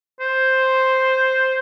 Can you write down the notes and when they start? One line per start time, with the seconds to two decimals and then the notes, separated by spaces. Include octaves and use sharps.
0.20 C5